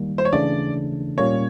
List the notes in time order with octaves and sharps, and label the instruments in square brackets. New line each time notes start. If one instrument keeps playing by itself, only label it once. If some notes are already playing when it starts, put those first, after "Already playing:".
Already playing: [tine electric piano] D#3 G3 A#3
[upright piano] C5
C#5
[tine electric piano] C#3 E3 A3 D4 [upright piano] D5
[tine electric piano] A#2 G3 A#3 C#4 [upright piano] C#5